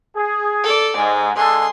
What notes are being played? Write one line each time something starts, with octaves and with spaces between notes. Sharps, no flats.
G#4
A4 D5
G#2 G#3
D3 G#3 G#4 A4 C6